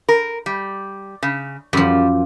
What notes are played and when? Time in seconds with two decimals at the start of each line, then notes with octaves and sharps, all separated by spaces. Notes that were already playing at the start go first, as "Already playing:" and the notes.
0.09 A#4
0.46 G3
1.23 C#3
1.73 F#2 F3 G3